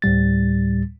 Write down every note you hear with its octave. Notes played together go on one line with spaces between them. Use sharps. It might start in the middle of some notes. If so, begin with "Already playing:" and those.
D2 A2 G3 A6